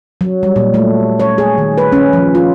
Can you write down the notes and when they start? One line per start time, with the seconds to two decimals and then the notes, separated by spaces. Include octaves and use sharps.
0.21 F#3
0.43 G3
0.56 A#2
0.74 A3
1.20 C#5
1.38 G#4
1.58 D#3
1.78 B4
1.92 C#4
2.13 F3
2.35 F4